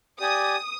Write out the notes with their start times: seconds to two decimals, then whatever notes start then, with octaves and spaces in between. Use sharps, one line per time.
0.20 G4 D5 G#5 D#6